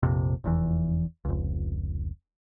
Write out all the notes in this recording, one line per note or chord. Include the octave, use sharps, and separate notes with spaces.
A#1 F2 C3
F1 E2 E3
F1 C#2